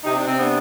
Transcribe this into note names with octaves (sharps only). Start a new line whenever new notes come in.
C3 D#4
D4
C3 C4
B3 D4